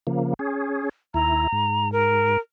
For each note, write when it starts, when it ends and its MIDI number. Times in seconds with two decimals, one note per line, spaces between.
0.07 0.34 49
0.07 0.34 53
0.07 0.34 58
0.39 0.89 61
0.39 0.89 68
1.14 1.47 39
1.14 1.47 64
1.14 1.91 82
1.52 2.37 44
1.92 2.38 70